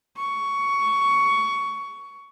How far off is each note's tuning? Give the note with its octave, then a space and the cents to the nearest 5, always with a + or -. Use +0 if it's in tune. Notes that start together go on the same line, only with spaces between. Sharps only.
C#6 +15